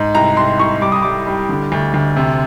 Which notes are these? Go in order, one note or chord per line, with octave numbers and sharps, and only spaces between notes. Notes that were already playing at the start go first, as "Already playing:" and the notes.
Already playing: G#2
C2 A#5
C2 C6
C2 C#6
G3 D6
D#6
G3 D6
G3
D3
D2
D2
C3